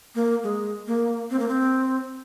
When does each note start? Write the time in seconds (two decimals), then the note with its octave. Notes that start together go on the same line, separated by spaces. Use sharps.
0.15 A#3
0.43 G#3
0.87 A#3
1.30 C4
1.39 A#3
1.48 C4